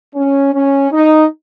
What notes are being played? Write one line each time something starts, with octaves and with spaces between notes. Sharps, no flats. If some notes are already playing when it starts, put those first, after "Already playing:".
C#4
C#4
D#4